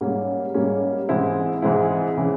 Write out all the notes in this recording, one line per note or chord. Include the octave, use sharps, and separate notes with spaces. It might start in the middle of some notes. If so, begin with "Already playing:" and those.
G#2 G3 A#3 C#4
G#2 G3 A#3 C#4
G#2 E3 G#3 C4 E4
G#2 E3 G#3 C4 E4
C#3 E3